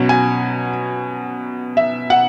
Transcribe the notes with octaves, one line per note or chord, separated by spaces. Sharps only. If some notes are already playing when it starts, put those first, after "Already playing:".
Already playing: B2 F#3 C#4
G#5
E5
F#5